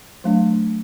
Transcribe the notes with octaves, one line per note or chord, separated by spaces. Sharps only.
F#3 A3 D4